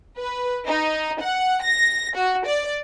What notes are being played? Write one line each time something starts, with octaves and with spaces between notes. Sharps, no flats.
B4
D#4
F#5
A#6
F#4
D5